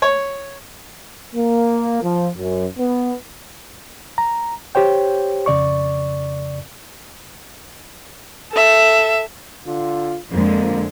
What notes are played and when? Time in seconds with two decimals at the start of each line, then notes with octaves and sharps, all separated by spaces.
0.02 C#5
1.35 A#3
2.02 F3
2.36 F#2
2.78 B3
4.18 A#5
4.75 G4 C5 C#5 G5
5.46 F2 C#3 D5 C#6
8.52 A4 E5
9.66 D3 F4
10.31 F2 D3 G#3 A#3